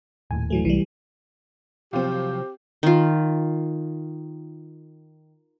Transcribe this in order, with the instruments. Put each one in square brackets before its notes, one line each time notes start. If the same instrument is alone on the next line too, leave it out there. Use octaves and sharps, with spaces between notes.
[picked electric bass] D#1 D#2 A2 [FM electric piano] G#5
[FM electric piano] E3 F#3 A3
[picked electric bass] C2 [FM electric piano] E3 G3
[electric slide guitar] C3 F3 F#3 [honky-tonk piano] C4 F4 [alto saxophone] G4
[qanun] D#3 F4